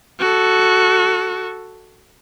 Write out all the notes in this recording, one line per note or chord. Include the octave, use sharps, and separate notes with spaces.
F#4 A4